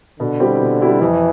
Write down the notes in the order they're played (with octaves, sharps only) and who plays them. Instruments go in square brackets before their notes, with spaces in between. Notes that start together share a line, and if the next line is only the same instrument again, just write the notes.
[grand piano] B2 [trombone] D3
[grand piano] G3 C4 E4 G4
B2
G3 C4 E4 G4
[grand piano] F2 [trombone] E3